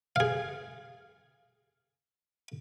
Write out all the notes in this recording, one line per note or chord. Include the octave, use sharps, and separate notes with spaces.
G#4 F5